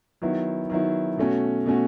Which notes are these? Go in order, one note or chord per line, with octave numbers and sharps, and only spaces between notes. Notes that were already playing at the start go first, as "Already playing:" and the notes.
D#3 F#3 B3 E4
D#3 F#3 B3 E4
B2 A3 C#4 F#4
B2 A3 C#4 F#4